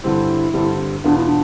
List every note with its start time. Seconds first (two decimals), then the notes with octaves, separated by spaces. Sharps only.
0.03 G2 D3 G3 C4 E4
0.54 G2 D3 G3 C4
1.04 E2 B2 B3 D4 F4
1.16 E4
1.27 D4